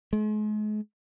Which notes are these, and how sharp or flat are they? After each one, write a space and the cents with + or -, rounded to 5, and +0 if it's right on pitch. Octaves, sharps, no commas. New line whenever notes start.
G#3 +40